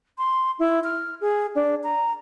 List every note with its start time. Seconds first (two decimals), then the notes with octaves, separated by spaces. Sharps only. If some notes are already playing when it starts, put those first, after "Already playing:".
0.18 C6
0.59 E4
0.84 F6
1.21 G#4
1.55 D4
1.84 A#5